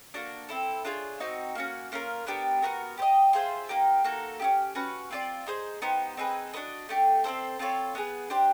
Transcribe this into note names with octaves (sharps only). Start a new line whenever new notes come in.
A#3 D4 F#4
C4 E4 A4
D4 F4 G#4 C#5
C4 D#4 F#4
A#3 C#4 F#4
A#3 C#4 F4 A#4
B3 D4 G4 A#4
B3 D4 F#4 A#4
G4 C5 D#5
F4 G#4 C5 E5
A#3 D#4 G4
A#3 D#4 F#4 A4
C#4 E4 G4
C#4 F#4 B4
C4 F4 A#4 D5
D#4 G#4 C5
B3 D#4 G4 C5
C4 D#4 G#4 B4
D4 F#4 B4 D#5
A3 D4 G4
C4 E4 A4 C5
C4 F4 A4 C#5
B3 D#4 G#4 B4
D4 G4 C5